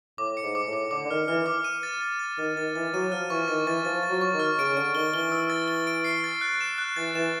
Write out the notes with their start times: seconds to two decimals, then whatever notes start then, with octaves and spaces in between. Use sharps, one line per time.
0.18 A2 D6
0.37 C#7
0.43 G#2
0.55 D6
0.67 A2
0.73 D6
0.91 D3 D6
1.06 D3
1.10 D#3 F6
1.28 E3 F6
1.46 D6
1.64 D#7
1.83 A6
2.01 A6
2.19 A6
2.38 D#3 A6
2.57 D#3 A6
2.75 E3 A6
2.93 F#3 D#7
3.12 F3 F6
3.30 E3 C#6
3.48 D#3 A6
3.66 E3 A6
3.85 F3 A6
4.03 A6
4.10 F#3
4.21 C#6
4.34 D#3
4.39 F6
4.59 C#3 D7
4.76 D3 D7
4.95 D#3 G7
5.14 E3 G7
5.32 E6
5.50 A6
5.68 G7
5.87 D7
6.04 C7
6.24 A6
6.41 F#6
6.61 E7
6.78 F#6
6.96 E3 A6
7.15 E3 E7